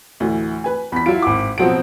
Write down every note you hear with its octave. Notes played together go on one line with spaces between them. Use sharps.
D2 A2 E3
B4 G#5
E2 B5 B6
F#3 E4 F4 D7
G#1 F#5 B5 D6
B2 F3 F#3 C4 F#5 D7